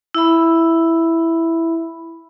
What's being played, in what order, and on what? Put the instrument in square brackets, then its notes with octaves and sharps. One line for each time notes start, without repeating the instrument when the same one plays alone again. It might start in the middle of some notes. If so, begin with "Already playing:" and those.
[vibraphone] E4 E5 B5